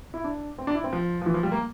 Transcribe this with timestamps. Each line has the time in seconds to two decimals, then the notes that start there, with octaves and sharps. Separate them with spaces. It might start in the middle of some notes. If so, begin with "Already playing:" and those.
0.14 E4
0.24 D4
0.58 C4
0.67 D4
0.75 E4
0.84 C4
0.93 F3
1.22 F3
1.26 E3
1.34 F3
1.43 G3
1.52 A#3